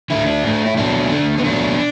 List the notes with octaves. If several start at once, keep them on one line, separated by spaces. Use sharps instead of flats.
D3 A3 E4
D4
A2 A3
E4
B2 F#3 A3 D4
D3 A3
B3
B2 F#3 A3 D4